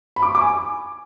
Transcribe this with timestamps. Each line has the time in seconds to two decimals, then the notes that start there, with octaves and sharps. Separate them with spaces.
0.16 B5
0.22 D6
0.29 C#6
0.35 D6
0.41 G#5